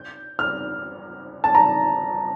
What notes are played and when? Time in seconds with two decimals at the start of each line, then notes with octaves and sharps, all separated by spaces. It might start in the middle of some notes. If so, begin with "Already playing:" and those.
Already playing: G6
0.39 F6
1.44 A5
1.55 A#5